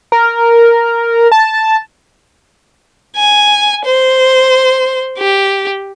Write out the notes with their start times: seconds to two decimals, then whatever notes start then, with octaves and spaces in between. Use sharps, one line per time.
0.12 A#4
1.32 A5
3.17 G#5
3.86 C5
5.18 G4